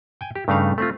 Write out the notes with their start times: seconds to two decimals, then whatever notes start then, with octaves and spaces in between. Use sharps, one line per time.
0.21 G5 G#5
0.36 G4
0.48 G2 C#3 A3 D4 D#4 F5
0.78 A3 C4 F4